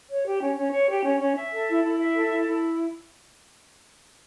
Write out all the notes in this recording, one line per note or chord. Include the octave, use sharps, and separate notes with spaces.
C#5
G4
C#4
C#4
C#5
G4
C#4
C#4
E5
A4
E4
E4
E5
A4
E4
E4